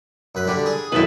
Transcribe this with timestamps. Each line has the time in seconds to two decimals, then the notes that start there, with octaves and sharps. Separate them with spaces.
0.35 F#2 B4
0.47 D3 G3 D4
0.66 G#4
0.92 B1 F#2 A2 E4 A4 B4